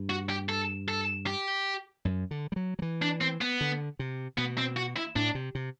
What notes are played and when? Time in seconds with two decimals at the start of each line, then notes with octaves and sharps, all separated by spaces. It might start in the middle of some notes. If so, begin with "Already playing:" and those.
Already playing: G2
0.10 F#4
0.30 G4
0.49 A4
0.88 A4
1.27 G4
2.05 F#2
2.31 D3
2.52 G3
2.56 F#3
2.79 F#3
2.82 E3
3.02 D4
3.21 C4
3.41 B3
3.61 D3
3.99 C3
4.38 B2 B3
4.58 C4
4.76 F#4
4.96 E4
5.16 A2 D4
5.35 C3
5.55 C3